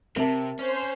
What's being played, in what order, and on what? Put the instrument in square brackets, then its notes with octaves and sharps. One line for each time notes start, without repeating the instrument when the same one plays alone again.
[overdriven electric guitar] C3 [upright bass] C4 [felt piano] A#4 E5 A5
[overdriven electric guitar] C#4 [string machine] C5